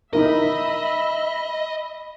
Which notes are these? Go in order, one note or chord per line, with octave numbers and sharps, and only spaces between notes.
D#4 E4 A#4 D#5 E5 B5